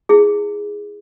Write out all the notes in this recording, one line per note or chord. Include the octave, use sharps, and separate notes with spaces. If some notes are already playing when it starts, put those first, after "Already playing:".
E4 G#4